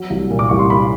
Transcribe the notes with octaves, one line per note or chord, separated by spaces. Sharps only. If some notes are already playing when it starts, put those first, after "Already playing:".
Already playing: F#3
C2
A#2
D6
C2 C#6
C6
A#3 B5